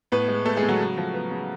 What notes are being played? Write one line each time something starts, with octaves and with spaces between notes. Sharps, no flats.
A2 B3 B4
G#3
A3 B3 A4
G#3 G#4
A2
F#3 F#4
C#3
F3
B3
C#3